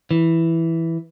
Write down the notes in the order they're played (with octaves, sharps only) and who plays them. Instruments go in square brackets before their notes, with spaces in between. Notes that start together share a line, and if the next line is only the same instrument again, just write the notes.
[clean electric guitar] E3